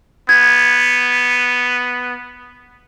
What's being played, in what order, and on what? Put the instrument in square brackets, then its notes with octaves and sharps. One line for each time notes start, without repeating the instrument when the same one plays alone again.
[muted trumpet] B3 [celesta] G#6